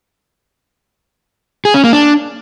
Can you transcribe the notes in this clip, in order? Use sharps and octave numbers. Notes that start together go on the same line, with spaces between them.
G#4
C#4
A#3
D4